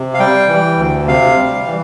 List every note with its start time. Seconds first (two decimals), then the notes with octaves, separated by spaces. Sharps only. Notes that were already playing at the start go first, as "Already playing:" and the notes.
Already playing: C3
0.14 F5
0.20 G3 G5
0.48 E3
0.78 D2
1.07 C3 F5
1.37 G3
1.66 E3